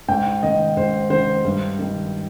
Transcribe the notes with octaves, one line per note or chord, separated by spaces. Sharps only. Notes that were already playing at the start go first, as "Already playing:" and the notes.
G#2 G5
D#3 D#5
G#2 C5
D#3 C5
G2
D#3